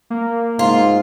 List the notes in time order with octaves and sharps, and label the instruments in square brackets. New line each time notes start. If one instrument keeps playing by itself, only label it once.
[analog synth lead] A#3
[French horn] G#2 [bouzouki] F4